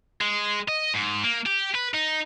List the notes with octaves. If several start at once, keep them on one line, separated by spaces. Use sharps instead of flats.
G#3
D#5
G#2
A#3
G4
B4
D#4